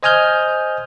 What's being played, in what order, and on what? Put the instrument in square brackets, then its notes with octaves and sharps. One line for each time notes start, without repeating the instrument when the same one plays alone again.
[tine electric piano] C5 D#5 G#5 D#6 F6 G6